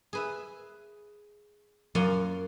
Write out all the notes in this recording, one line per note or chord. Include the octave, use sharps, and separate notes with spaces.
G#4 B4 E5
F#2 A#3 F4 F#5 G#5 C6